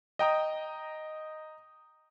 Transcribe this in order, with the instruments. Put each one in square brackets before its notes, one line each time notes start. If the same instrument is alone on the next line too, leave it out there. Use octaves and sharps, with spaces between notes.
[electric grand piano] D#5 G5 A#5 D#6